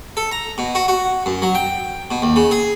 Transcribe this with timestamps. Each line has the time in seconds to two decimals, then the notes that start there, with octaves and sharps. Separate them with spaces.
0.17 A4
0.32 A#5
0.58 B2
0.75 F#4
0.88 F#4
1.26 F#2
1.42 F#3
1.55 G5
2.11 B2
2.22 D#2
2.36 C#3
2.51 G#4